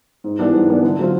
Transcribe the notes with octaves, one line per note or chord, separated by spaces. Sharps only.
G#2
E3 G3 B3 D4
G#2
E3 G3 B3 D4
D3
F#3 A3 C4 F4